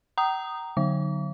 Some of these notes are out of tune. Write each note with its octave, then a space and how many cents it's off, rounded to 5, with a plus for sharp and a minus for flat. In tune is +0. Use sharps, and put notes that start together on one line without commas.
G5 -40 A#5 +0 D#6 -10
D3 +0 F#3 +0 D6 -45